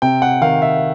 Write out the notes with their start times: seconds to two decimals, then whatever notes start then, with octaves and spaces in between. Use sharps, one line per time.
0.02 C3 G5
0.22 F#5
0.41 D#3 F5
0.62 E5